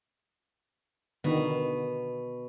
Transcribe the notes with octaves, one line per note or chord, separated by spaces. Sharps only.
B2 D3 D#3 B3